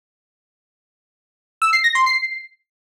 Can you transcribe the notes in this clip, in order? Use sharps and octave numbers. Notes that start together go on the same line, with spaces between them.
E6
C7
A#6
C6
C7